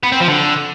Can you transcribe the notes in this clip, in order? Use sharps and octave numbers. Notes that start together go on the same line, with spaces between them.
B3
C4
F3
D3